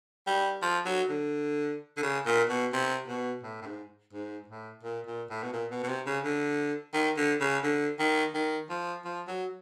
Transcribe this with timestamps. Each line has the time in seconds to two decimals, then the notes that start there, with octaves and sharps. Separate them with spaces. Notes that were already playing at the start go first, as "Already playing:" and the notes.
0.27 G3
0.62 F3
0.86 F#3
1.09 D3
1.97 D3
2.02 C#3
2.26 A#2
2.49 B2
2.73 C3
3.07 B2
3.43 A2
3.62 A2
3.66 G#2
4.13 G#2
4.48 A2
4.83 A#2
5.06 A#2
5.30 A2
5.43 B2
5.53 A#2
5.71 B2
5.83 B2
5.88 C3
6.06 C#3
6.24 D3
6.94 D#3
7.17 D3
7.41 C#3
7.64 D3
7.99 D#3
8.34 D#3
8.69 F3
9.05 F3
9.28 F#3